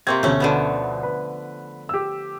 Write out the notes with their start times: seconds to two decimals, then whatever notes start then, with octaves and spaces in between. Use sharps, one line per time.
0.07 C3 A#3 C4 C6 C#6 G#6
0.23 D2 B2 A3 C#4
0.40 D3 F3 B3
1.03 B4
1.89 G4 E6